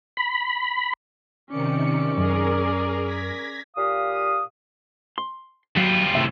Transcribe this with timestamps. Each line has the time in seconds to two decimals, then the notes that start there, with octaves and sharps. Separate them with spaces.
0.17 B5
1.50 C3 D#3 C#4 D5 C#7
2.18 F#2 G#4 A#4
3.04 G#6 A#6 B6
3.77 A#2 G4 F5 D#6
5.18 C6
5.77 F#3 G3 F4
6.15 A2 C3 E5